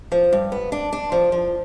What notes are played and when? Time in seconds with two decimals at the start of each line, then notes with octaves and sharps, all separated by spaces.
0.12 F3
0.33 G2
0.52 B3
0.72 D4
0.92 D4
1.12 F3
1.32 F3